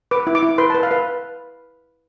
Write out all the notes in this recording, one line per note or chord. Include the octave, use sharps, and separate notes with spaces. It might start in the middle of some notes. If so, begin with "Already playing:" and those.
B4 D6
E4
D6
E4
B4 C6
A5
B4
F5
B4